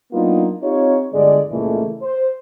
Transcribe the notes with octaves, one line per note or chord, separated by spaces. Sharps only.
F#3 A#3 B3 D4 D#4 F4
C4 D#4 F4 G4 C#5
G1 D3 G#3 D5
C#2 A#2 E3 G#3 A3
C5